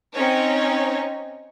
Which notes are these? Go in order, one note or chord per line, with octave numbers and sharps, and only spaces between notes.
C4 C#4 D#4 C#5